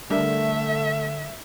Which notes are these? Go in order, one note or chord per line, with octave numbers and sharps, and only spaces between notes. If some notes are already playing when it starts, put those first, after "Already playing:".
D3 G3 A3 D4 A#4 E5